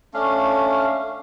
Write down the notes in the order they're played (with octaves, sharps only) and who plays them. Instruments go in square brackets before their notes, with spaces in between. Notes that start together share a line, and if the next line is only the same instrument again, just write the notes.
[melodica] A3 C#4 D4 F5